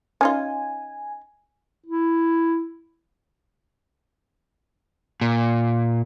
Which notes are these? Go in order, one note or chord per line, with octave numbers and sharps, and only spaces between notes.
C#4 D#4 F4 G#5
E4
A#2